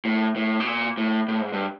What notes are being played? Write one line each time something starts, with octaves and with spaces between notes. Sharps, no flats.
A2
A2
B2
A#2
A2
A2
G#2
G2